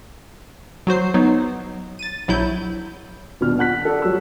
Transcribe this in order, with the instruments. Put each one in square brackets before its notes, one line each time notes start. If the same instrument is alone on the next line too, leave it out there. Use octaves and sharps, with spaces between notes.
[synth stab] F#3 F#4 C5 C7
F#3 B3 D#4
A6 D#7
A#1 F#3 E4 G6
[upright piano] D#1 B2 D4 F6
F#5 F#6 B6
A4 D5
F#3 G3 E6